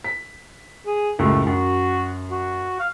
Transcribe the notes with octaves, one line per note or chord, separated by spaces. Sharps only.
B6
G#4
C#2 F#2 A2 A3
F#2 F#4
F#4
F5